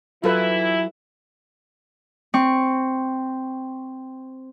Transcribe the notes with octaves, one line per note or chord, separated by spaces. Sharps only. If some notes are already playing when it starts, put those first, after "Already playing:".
E3 F#3 E4 F4 A4 B4
C4 C#6